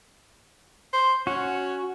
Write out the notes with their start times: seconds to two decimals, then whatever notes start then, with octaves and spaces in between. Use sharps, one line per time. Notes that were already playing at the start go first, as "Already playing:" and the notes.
0.93 C5
1.27 C#4 F#4